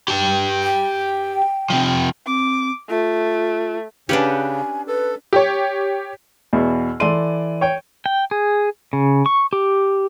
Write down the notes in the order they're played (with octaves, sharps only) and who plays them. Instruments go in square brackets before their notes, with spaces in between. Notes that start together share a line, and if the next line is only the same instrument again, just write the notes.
[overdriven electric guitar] G4 A5
[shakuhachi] G5
[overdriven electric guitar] C3 F3
[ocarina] C4 [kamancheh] D6
[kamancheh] A3 [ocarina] F4
[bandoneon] C#3 [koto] C#4 D4 [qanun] G4 B4 F#5 [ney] G#5
[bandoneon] A4 [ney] B4
[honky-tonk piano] G4 C#5
[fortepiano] E2 B2
[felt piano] E3 D5 D#7 [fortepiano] A4 C6
[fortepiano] C#5 G5
[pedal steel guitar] G5
G#4
C#3
C#6
G4